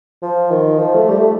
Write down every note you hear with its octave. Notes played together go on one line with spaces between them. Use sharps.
F3
D#3
F3
A3
G3
A3